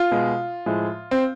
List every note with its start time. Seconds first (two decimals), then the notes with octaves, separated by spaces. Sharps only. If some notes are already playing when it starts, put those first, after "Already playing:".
Already playing: F4
0.11 B2 G#3
0.66 A2 F3 G#3
1.11 C4